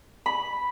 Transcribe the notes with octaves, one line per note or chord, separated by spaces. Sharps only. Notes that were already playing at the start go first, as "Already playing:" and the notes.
B5